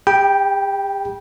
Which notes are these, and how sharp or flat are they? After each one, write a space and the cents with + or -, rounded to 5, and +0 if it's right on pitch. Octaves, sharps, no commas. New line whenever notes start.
G4 +40 G5 +0 B5 -25